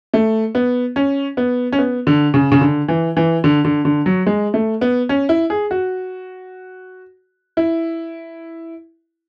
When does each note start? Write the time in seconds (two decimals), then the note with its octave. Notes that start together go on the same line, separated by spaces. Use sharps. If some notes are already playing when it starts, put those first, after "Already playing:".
0.14 A3
0.55 B3
0.96 C#4
1.37 B3
1.72 C#4
1.78 B3
2.07 D3
2.34 C#3
2.52 C#3
2.61 D3
2.88 E3
3.17 E3
3.44 D3
3.65 D3
3.85 D3
4.06 F#3
4.27 G#3
4.54 A3
4.81 B3
5.09 C#4
5.29 E4
5.50 G#4
5.71 F#4
7.57 E4